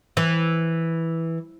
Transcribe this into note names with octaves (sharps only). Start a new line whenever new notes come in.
E3